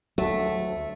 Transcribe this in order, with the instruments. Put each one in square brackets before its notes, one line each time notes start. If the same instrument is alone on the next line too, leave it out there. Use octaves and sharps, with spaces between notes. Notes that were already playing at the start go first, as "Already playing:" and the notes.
[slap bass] D2 F#3 [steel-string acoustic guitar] A3